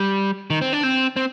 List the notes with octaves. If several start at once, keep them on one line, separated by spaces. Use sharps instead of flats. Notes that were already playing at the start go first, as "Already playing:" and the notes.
Already playing: G3
D#3
C4
D4
C4
C4